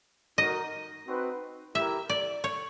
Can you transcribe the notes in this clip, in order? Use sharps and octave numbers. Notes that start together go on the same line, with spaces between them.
D#4 F#4 A#4 D#5
C4 D#4 F#4 B4
E4 G4 A#4 E5
D5
C#5